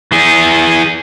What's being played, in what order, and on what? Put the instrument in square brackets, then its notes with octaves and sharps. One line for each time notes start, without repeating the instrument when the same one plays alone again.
[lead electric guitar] E3 G#4